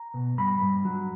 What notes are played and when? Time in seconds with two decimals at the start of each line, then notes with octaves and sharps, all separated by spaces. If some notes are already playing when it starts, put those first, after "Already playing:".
Already playing: A#5
0.14 B2
0.38 G2 B5
0.61 G2
0.85 F#3